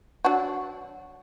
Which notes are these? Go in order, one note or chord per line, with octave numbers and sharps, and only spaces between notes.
F#3 D4 F#4